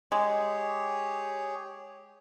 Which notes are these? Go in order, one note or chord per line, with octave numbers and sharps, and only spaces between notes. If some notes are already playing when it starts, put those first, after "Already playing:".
G#3 G4 G#4 C#5